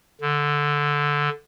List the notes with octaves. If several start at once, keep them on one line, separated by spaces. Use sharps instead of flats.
D3